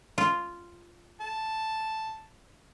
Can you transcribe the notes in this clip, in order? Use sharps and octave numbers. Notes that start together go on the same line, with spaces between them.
F4
A5